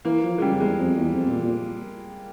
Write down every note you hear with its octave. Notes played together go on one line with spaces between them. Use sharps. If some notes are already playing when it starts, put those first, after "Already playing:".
E3 A#3
F3
G#3
C#3 G3
F2
E2 G#3
F2
E2
F2
A#2
A#2